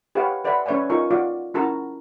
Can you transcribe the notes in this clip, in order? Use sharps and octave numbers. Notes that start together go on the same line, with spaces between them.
G4 B4 C#5 D#5 F5 F#5
B4 D5 E5 F#5 B5 C6
C#4 B4 C#5 D5 E5 G#5
D#4 F4 A#4 G#5 C#6
F4 F#4 D5 F5 D6
C#4 E4 F#4 A#4 A5 A#5